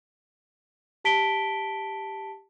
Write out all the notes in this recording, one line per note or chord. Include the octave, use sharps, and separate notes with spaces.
G4 A5 B6 D7 G7